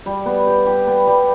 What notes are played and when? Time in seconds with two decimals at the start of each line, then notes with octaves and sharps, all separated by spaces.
0.06 G3
0.26 B3
0.47 G4
0.67 G4
0.87 B3
1.07 G3